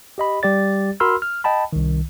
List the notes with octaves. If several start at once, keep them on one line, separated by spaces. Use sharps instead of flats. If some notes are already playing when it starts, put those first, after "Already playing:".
G4 D#5 B5
G3 G4 D5 A6
F#4 A#4 B5 C6 E6 F6
F6
D#5 G5 A5 B5
C2 D#3